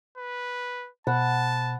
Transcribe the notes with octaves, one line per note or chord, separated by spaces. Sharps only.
B4
B2 C5 F#5 A5 B5 F#6